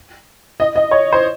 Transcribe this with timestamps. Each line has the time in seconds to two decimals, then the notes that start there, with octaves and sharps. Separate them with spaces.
0.60 D#5
0.76 D#5
0.91 C#5
1.13 C5